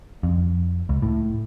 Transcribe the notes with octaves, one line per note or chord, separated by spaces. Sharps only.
F2
C#2
A2